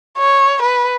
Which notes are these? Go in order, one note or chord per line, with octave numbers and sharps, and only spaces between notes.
C#5
B4